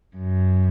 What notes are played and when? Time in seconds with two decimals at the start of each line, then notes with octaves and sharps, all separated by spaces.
0.17 F#2